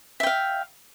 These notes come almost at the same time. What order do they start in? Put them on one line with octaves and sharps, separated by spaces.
E5 G5 F5